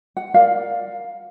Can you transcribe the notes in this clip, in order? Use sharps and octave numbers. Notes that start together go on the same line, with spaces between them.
F#5
A#4 D5 F5